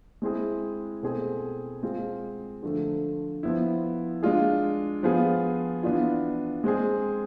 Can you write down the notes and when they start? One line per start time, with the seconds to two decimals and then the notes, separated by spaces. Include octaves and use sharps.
0.22 G#3 C4 E4 G#4
1.02 B2 A3 C4 G#4
1.83 G#3 C4 F4 G#4
2.63 D3 F3 A3
3.43 F3 B3 E4
4.23 G#3 D4 F4 G#4
5.03 F3 B3 F4 G#4
5.83 E3 B3 D4 F4
6.64 G#3 C4 G#4